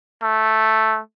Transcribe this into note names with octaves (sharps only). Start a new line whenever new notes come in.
A3